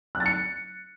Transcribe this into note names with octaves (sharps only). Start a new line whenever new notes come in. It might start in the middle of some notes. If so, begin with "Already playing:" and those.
F#6
A6
C#7